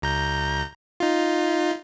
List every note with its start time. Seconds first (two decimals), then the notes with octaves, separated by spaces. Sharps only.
0.02 C#2 A#5 G6
1.00 D#4 F4